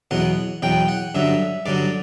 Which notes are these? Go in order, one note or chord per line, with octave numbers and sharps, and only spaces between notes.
E2 B2 F#3 F#5
E2 B2 F#3 G5
F#5
G2 D3 F#3 E5
G2 D3 F#3 D5